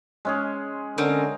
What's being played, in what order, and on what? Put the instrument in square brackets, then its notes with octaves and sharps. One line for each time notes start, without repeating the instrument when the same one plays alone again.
[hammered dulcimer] G#3 C#4 G#4
[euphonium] D3 [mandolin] C4 C#4 A#4